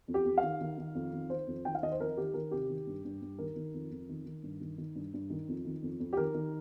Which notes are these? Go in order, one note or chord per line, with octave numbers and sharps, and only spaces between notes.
F2
G4
F2
F5
D#3
D#3
D#3
F2
D#3
D#3 C5
F2
D#3 G5
F5
D#3 D#5
C5
F2 A#4
D#3 G4
D#3 A#4
C3 G4
D#3
G2
G2
G2
D#3 A#4
D#3
F2
F2
D#3
D#3
G2
D#3
D#3
G2
G2
D#3
F2
D#3
F2
F2
G4
D#3 A#4
D#3